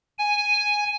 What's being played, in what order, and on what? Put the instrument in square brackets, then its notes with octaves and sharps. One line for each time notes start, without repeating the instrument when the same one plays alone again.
[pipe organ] G#5